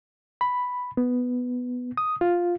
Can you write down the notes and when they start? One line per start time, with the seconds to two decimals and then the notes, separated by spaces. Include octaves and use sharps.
0.41 B5
0.97 B3
1.97 D#6
2.21 F4